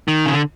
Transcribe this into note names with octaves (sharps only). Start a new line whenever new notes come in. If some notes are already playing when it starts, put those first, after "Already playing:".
D#3
C#3
D3